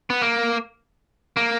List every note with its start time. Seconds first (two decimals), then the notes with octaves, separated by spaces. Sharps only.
0.10 B3
0.22 A#3
1.37 A#3